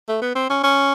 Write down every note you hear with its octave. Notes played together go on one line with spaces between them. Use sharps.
A3
B3
C4
C#4
C#4